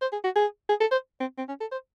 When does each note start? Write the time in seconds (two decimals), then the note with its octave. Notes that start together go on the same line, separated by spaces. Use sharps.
0.01 C5
0.13 G#4
0.24 F#4
0.36 G#4
0.69 G#4
0.80 A4
0.92 C5
1.20 C4
1.38 C4
1.49 C#4
1.61 A4
1.72 C5